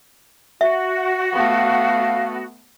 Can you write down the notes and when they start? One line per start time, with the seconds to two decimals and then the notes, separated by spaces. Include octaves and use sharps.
0.61 F#4 E5
1.33 A3 B3 F5